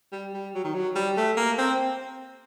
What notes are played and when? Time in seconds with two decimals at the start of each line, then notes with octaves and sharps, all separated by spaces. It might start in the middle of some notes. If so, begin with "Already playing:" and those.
0.13 G3
0.34 G3
0.55 F#3
0.64 D#3
0.74 F#3
0.95 G3
1.17 A3
1.37 A#3
1.58 C4